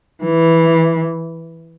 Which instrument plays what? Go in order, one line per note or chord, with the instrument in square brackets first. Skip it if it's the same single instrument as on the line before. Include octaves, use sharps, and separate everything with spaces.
[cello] E3